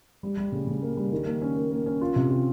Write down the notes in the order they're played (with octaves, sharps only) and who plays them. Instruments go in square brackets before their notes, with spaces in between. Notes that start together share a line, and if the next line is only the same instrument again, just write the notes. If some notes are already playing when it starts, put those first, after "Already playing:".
[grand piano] G3
G3
C#3
C#3
A#3
G3
D#3
A#3
C#4
A#3
A#3
C#4
F4
C3
F4